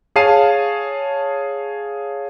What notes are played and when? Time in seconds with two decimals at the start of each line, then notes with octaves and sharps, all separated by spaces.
0.16 G#4 C#5 F5 A5 C7 D#7